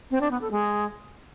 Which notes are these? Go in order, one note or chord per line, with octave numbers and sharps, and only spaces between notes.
C4
D4
B3
A4
G#3